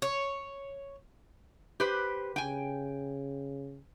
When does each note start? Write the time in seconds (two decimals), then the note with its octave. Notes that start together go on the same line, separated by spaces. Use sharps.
0.02 C#5
1.80 G4 B4 C5
2.36 C#3 G5 G#5